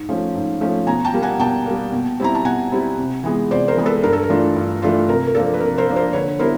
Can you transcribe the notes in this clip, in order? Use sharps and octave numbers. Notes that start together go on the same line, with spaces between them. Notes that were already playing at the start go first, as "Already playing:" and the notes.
Already playing: G#2
F3 A3 C#4
G#2
F3 A3 C#4
B2 G#5 A#5
G5 A5
G3 A#3
F#5 G#5
B2 G5 A5
G3 A#3
B2
G3 C4 E4 A#5
A5
B2 F#5 G#5
G3 C4 E4
C3
E3 G#3 B3
C3 C5 D5
A#4 C5
E3 G#3 B3
A4 B4
G2 A#4
A4
A#4
E3 A3 D4 F4
G2
E3 A3 D4 F4
C3 A#4
A#4
F3 A#3 D4 A4
B4
C3 A#4
A#4 C5
F3 A#3 D4
A#4 C5
D3 B4 C#5
G3 B3 E4 A#4 C5